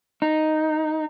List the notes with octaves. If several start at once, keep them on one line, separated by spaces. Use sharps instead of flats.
D#4